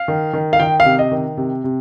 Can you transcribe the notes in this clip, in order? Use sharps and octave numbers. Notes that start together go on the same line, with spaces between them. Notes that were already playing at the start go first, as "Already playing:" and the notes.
Already playing: F5
D#3
D#3
F5
D#3 G5
F5
C3
D#5
D#3
C3
C3